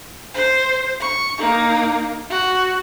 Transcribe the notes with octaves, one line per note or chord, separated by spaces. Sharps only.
C5
C#6
A#3 D#4
F#4